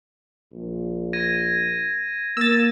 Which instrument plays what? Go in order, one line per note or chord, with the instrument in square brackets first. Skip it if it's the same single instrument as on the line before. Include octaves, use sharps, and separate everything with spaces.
[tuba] A#1
[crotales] G#6 A#6 D#7
[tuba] A#3 [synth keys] E6 A6